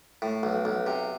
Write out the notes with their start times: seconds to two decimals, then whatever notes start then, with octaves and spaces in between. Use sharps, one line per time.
0.22 A2
0.43 B1
0.65 B1
0.86 C3